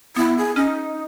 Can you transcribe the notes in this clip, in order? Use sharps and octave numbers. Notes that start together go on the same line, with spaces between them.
B3 E4
G#4
C#4 D#4